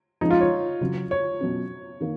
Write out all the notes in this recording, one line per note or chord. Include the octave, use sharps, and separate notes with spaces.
F3 G#3 C#4 D#4
F4
C#5
C#3 F#3 C#4
C#5
B2 F#3 C#4
D#3 A#3